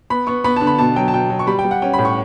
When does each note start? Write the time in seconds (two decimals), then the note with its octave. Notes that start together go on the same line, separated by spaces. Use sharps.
0.10 B3 B5
0.27 B3 C#6
0.44 B3 B5
0.56 A5
0.61 D3
0.67 B5
0.79 B2 A5
0.96 F#3 G5
1.08 A5
1.13 B2 G5
1.30 F#3
1.39 C#6
1.47 G3 B5
1.59 G5
1.64 G3
1.71 F#5
1.82 C#4 G5
1.93 B5
1.99 A2
2.05 C#6